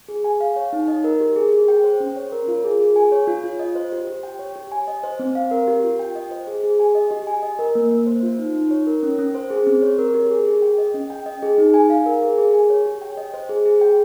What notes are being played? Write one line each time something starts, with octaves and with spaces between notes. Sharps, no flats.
G#4
G#5
F5
C#5
D#4
D#5
A#4
G4
G#4
G#4
G5
C5
C#4
C#5
A#4
F4
G#4
G#4
G#5
C#5
F4
F4
D#5
C5
G4
G4
G5
C#5
G4
G#5
D#5
C5
C4
F5
A#4
G4
F4
G5
D#5
C5
G#4
G#4
G#5
D#5
G4
G#5
D#5
A#4
A#3
A#3
C5
F4
D#4
D#4
C#5
A#4
C#4
C#4
C5
G#4
C4
C#5
A#4
G4
G#4
G#4
G5
D#5
C#4
G5
D#5
G#4
D#4
G#5
F5
A#4
G#4
G#4
G#5
C#5
G4
G5
D#5
C5
G#4
G#4
G5